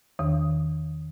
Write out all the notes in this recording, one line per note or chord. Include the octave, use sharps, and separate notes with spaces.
E2 D#3